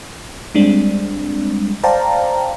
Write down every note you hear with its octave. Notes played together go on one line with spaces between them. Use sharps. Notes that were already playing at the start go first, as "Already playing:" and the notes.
G3 G#3 C4 D4
C5 D5 F5 G5 A5 A#5